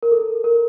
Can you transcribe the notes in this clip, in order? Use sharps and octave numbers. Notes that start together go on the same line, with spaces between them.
A#4
A4
A#4